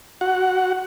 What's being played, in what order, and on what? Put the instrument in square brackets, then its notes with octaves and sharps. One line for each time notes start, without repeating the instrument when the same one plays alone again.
[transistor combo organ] F#4 F#5